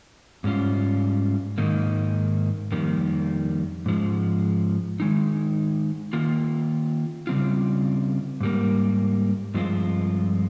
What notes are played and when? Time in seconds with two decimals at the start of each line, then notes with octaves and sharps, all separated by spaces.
0.44 G#2 G3 C#4 F4
1.58 G#2 D#3 A#3 D#4
2.72 F2 D#3 G3 A#3
3.86 G#2 F3 G#3
5.00 D#3 G#3 D#4
6.13 D#3 A#3 F4
7.27 C#3 G3 C4 F4
8.41 G#2 G3 A#3
9.54 G2 F3 G#3 C4 F4